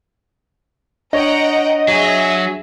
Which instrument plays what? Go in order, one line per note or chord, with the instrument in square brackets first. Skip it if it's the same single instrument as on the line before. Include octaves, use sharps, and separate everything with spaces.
[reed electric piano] D4 C#5 [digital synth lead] D#5 [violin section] F#5 G5 A#5
[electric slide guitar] F#3 [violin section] G#4 E5